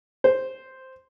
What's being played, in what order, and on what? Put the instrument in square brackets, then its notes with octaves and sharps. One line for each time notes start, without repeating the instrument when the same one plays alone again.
[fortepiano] C5